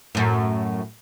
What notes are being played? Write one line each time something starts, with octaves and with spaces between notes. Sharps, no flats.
F#2 A2